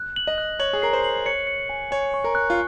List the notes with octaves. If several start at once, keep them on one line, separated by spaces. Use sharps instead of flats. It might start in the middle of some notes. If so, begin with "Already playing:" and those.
Already playing: F#6
F#7
D#5
F#6
C#5 F#7
G#4
A#4 C7
C5
F#7
C#5 C#7
C#7
G#5
C#5 G#5
C#6
A#4
F#6
F4